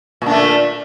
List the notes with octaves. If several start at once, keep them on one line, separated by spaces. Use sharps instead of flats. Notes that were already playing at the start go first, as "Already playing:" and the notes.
A#2 A3 D4